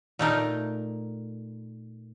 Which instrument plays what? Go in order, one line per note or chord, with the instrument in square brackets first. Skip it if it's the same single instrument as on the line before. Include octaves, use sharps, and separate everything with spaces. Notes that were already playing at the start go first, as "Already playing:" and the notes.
[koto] A#2 A3 D#4 A#4